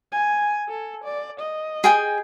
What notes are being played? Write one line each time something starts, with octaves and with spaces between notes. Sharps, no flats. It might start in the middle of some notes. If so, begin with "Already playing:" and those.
G#5
A4
D5
D#5
G#4 G5 G#5